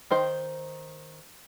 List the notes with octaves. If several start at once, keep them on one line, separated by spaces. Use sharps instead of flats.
D#3 D#4 C5